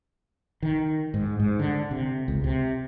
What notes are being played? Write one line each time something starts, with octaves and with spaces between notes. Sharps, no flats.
D#3
G#2
G#2
D3
C3
C#2
C3